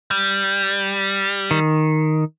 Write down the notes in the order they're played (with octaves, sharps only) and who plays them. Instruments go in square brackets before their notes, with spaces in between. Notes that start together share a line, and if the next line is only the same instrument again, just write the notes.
[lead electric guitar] G3
[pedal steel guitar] D#3